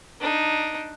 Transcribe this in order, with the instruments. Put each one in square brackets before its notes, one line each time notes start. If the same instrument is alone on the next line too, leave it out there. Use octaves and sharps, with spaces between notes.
[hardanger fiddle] D4 D#4